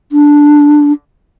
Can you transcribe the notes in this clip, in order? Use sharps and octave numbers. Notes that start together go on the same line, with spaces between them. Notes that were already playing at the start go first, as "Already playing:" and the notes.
D4